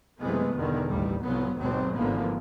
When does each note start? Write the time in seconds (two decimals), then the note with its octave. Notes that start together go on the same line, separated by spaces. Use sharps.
0.20 F#1 C3 E3 G#3 A3 B3
0.54 G1 E2 B2 D3 D#3
0.89 A1 D#2 G3
1.23 C2 G#2 F3 F#3 B3
1.56 G#1 D#2 G#2 B2 F#3 C4
1.97 G#1 D3 E3 F3 A#3 B3